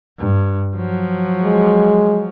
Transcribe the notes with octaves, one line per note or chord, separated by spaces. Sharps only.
G2
F3 F#3
G#3